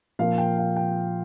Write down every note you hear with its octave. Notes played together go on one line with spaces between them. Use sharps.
A#2 F3 F5
G5
F5
G5